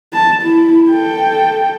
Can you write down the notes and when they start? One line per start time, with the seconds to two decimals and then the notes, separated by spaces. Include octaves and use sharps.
0.13 A5
0.43 E4
0.90 A4 G5